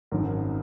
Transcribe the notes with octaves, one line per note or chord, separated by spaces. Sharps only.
G#1 F#2 D#3 A#4